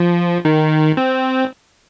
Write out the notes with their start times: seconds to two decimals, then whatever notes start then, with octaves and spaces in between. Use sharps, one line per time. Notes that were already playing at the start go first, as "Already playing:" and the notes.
Already playing: F3
0.45 D#3
0.97 C4